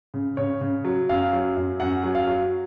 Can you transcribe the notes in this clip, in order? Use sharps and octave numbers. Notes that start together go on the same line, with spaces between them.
C#3
C#3 C#5
C#3
F#3
F#2 F5
F#3
F#2
F#2 F#5
F#3
F5
F#3